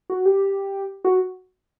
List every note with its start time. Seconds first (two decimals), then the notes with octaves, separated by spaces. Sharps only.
0.10 F#4
0.26 G4
1.05 F#4